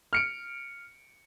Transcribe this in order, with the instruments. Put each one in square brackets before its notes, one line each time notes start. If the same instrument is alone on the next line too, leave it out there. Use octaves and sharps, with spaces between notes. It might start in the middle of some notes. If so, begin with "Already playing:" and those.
[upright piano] F6 C#7 D7